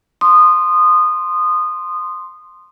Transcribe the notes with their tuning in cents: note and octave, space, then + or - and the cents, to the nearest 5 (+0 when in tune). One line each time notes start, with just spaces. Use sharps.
C6 +0 D#6 -20